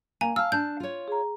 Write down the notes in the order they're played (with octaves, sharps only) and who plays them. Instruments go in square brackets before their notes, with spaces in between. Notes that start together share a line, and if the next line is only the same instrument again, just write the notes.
[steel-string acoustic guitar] A#3 [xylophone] G#5 A#5
[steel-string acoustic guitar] F5 A5 [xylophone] E6 [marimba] F6
[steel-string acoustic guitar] D4 A5 [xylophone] G6
[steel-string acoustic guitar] F4 C#5
[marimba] G#4 A#5